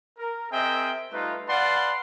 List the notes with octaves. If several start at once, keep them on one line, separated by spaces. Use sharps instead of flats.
A#4
C4 G#4 A#4 D#5 E5 G5
G3 A3 D#4 F4 B4
B4 D5 F5 F#5 A5 C6